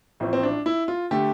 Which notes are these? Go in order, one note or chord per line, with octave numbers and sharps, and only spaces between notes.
A1 A2 F3 C4
C4
D4
E4
F4
D3 A3 G4